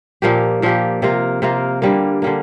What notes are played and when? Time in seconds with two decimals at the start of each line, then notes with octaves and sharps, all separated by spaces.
0.22 A#2 F3 A#3 G4
0.62 A#2 F3 A#3 G4
1.02 C3 A#3 F4 A#4
1.42 C3 A#3 F4 A#4
1.82 D3 G3 A#3
2.22 D3 G3 A#3